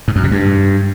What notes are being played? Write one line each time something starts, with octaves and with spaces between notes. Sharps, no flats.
G#2
F#2
C3
G2